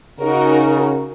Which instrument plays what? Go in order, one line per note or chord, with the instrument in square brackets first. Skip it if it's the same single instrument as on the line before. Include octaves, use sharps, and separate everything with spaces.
[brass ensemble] C#3 [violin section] D#4 F#4 A#4